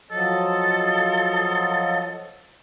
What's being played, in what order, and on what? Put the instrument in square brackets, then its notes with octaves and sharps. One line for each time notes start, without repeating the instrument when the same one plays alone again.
[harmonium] F3 F#3 D#5 [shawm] A4